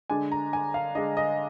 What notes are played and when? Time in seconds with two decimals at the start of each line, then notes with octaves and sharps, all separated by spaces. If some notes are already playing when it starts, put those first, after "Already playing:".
0.10 D3 G#3 D4 G#5
0.32 A#5
0.53 G#5
0.74 F5
0.95 D3 G#3 D4 D#5
1.17 D#5